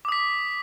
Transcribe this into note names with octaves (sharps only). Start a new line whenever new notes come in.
D6 D#6 B6